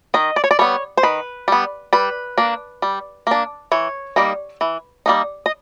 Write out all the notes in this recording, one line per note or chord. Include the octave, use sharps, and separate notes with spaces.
D#3 D#5
D5
C#5
D5
G3 B3 C#5
C5
D#3 B4
G3 B3
G3 B4
A#3 D4
G3
A#3 D4
E3 C#5
G3 A#3 D#4
E3
G3 A#3 D#4
D#5